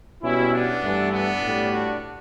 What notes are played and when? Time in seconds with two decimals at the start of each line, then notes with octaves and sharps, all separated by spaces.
0.23 B2 G3 C#4 E4
0.53 B3 D4
0.82 G2 E3 A3
1.12 B3 D4
1.41 A2 G3
1.71 D4 F#4